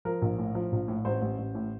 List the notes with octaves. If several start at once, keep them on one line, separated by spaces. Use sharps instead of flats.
F3 A#4
A#1
A2
F3
A#1
A2
A1 C5
A1
A1
A2